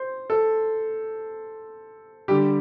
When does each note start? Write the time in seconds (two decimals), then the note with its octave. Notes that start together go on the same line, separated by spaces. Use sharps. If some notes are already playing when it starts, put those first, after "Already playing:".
Already playing: C5
0.30 A4
2.28 D3 G3 G4